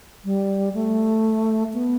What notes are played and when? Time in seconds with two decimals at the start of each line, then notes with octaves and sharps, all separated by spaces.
0.24 G3
0.74 A3
1.73 B3